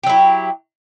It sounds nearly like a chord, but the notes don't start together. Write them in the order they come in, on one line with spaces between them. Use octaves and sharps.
G4 F#3 E4